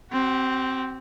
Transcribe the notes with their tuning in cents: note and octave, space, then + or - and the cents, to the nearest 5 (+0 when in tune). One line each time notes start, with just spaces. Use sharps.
C4 +0 F#4 +45